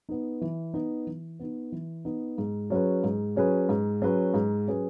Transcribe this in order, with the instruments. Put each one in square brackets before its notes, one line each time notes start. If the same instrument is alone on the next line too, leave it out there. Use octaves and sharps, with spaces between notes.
[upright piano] B3 D#4
E3
B3 D#4
E3
B3 D#4
E3
B3 D#4
G#2
F#3 C#4 G#4 B4
G#2
F#3 C#4 G#4 B4
G#2
F#3 C#4 G#4 B4
G#2
F#3 C#4 G#4 B4